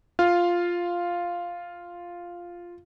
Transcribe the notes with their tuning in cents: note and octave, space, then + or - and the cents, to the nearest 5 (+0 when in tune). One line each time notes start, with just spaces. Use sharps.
F4 +0 F5 +0